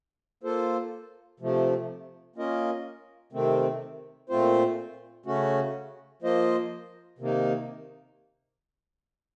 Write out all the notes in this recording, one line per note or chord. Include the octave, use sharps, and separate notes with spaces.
A#3 F4 A4 C5
C3 F3 A3
A#3 C#4 F4 A#4 D#5
C3 D#3 A3 C4
A#2 A3 C4 F4 C5
C#3 A3 C#4 F#4
F3 A#3 F4 C5 D#5
C3 D#3 A#3 D#4